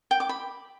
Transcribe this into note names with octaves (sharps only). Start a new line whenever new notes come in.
G5
D6
B5